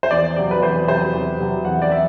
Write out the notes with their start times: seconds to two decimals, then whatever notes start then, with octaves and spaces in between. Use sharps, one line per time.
0.03 C5
0.11 E2 D5
0.36 C3 F#3 D5
0.51 B4
0.63 E2 C5
0.88 C3 F#3 C5
1.14 E2
1.39 C3 F#3
1.65 E2 F#5
1.82 D5
1.91 F#3 E5